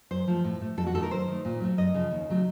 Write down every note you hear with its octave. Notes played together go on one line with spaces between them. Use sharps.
F#2 C5
F3 A3
A2
A3
F2 A4
F#4
D#3 A3 A4
A#4
F#2 C5
D#3 A3
A#2
F#3 A3
F#2 D#5
C#3 F3
D#2
C#3 F#3 A3